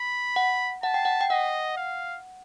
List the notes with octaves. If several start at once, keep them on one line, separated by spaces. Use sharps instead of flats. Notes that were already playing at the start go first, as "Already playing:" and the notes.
Already playing: B5
F#5
F#5 A5
G5
F#5
G5
D#5 F#5
F5